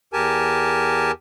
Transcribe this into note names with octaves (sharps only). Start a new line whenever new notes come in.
E2 G4 A#4 G#5 A5